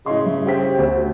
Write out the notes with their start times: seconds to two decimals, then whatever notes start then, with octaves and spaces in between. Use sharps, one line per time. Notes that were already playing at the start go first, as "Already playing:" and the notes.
0.06 A2 C#3 D#5 C6
0.25 G2 E5
0.46 G4 C5 G5 B6
0.78 D2